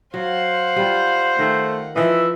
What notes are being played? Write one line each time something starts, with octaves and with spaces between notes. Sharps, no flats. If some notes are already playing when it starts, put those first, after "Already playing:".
F#3 C5 F5 F#5
G3 F4
D#3 A3 A#4
E3 F3 D#5 E5